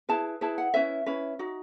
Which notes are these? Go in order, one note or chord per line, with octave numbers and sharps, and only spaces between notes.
E4 G#4 B4 A5
E4 G#4 B4 A5
F#5
C#4 E4 B4 E5
C#4 E4 B4
D#4 F#4